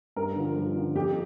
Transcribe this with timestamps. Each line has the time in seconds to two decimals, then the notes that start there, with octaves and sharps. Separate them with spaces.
0.16 G2 A#4
0.36 D3 F3
0.56 G2
0.76 D3 F3
0.95 F2 G4